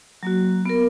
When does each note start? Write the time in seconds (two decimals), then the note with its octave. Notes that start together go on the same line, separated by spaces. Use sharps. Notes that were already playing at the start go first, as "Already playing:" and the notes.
0.23 F#3 A#3 F#4
0.66 B3 A#4